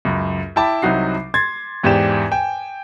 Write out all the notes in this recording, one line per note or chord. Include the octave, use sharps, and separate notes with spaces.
C#2 F#2
E4 G5 A5 B5 D6
C2 C3 F#3 D#4 F#4 C7
C6 G#6 A6
E2 G#2 G4 D5 G5 E7
G5 G#5